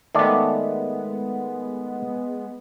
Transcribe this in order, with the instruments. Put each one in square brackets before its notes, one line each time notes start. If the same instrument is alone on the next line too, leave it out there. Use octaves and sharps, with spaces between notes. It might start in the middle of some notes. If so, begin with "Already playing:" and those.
[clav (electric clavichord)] D#3 A3 D5 [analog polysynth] G#3 B3